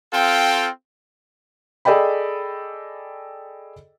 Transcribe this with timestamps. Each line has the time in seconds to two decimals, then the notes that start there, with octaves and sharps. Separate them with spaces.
0.14 C4 F4 A4 F5 G5
1.85 G#4 A4 D5 D#5 G5 B5